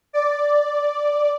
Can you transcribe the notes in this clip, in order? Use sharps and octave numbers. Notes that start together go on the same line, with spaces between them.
D5